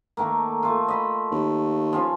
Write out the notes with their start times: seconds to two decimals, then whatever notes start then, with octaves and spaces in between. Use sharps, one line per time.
0.17 D#3 A3 A#3
0.63 A3 F4
0.88 D#5 B5
1.31 D#2
1.93 F3 C#4 F4